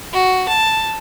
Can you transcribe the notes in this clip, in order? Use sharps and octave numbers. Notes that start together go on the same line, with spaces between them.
F#4
A5